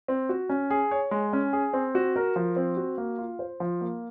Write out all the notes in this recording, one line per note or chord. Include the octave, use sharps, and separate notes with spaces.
C4
F#4
C#4
G#4
C#5
G#3
C#4
G#4
C4
F#4
A#4
F3
C4
F#4
A#3
F4
C5
F3
A#3